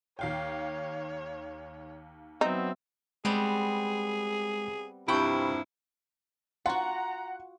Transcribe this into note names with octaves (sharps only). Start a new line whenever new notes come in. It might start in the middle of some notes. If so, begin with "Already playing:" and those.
D#2 C#5 F5 G5
F#3 B3 C4 D#4 E5
G3 G#3 B3 C4 G#4
G2 C3 F3 E4 F#5 G5 B5 C#6
F4 F#4 F#5 A#5